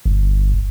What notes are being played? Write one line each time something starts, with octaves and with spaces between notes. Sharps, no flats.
G1